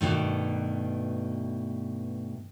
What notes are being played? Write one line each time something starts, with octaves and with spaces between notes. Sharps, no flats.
G2 B2 D#3 A3